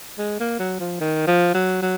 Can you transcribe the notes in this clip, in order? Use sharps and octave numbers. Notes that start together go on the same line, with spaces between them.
G#3
A#3
F#3
F3
D#3
F3
F#3
F#3